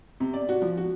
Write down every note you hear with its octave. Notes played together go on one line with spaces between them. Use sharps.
C3
D5
F#4
F3
F#4